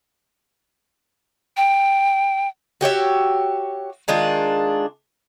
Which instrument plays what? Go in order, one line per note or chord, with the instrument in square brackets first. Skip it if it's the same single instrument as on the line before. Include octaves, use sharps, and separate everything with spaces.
[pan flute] G5
[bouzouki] F#4 G4 C#5 E5
D#3 G#3 D4 F4